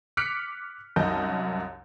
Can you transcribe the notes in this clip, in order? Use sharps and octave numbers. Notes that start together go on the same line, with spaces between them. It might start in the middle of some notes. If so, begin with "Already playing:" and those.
D6 F6 F#6 B6 C#7 D7
C2 F#2 D#4 D#5 A5 G6